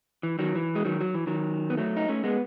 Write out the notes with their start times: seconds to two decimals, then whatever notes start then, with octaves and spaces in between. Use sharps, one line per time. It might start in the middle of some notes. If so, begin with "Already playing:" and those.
0.23 E3
0.39 D#3 F#3
0.55 E3
0.75 G#3
0.85 D#3 F#3
1.01 F#3
1.14 E3
1.27 D#3 F#3
1.70 B3
1.77 F#3 A3
1.97 D#4
2.08 A3 C#4
2.24 G#3 B3